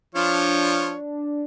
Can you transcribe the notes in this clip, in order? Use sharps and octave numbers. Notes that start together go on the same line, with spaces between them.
F3 D4 F4 C#5